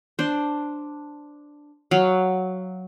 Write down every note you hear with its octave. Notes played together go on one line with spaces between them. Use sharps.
D4 C5
F#3 F5